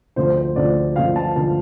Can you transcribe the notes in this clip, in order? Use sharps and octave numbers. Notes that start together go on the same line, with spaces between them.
D2 D3 F3 C5
C5
D2 D3 F3 D5
D2 D3 F3 F5
A5
D3 F3 A5